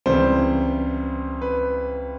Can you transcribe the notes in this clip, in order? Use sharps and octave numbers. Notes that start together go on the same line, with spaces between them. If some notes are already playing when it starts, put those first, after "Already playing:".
C#2 C3 E3 G3 C5
B4